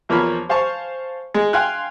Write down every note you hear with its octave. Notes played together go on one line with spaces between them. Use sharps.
E2 F3 A#3 C#5 B5 F6
C5 F5 G#5 A5 C#6
G#3
F5 G5 G#5 C6 F6 F#6